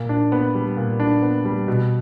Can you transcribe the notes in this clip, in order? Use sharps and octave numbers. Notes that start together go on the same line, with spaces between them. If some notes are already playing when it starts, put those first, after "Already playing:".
Already playing: A#2
D4
B3
G3
A#2
D4
B3
G3
B2